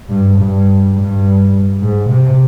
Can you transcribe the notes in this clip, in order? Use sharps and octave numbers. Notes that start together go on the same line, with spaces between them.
G2
G2
G2
G#2
C3